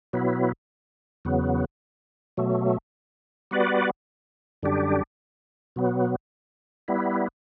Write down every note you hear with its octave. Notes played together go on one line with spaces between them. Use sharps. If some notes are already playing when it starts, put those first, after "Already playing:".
B2 F#3 B3 E4
E2 C#3 F#3 B3
B2 F#3 A3
G3 B3 F#4 B4 D5
F#2 D3 G3 D4 G4
B2 F#3 B3
G3 B3 E4